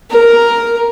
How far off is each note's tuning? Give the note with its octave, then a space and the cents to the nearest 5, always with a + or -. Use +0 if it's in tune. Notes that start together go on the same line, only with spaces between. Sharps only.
A#4 +0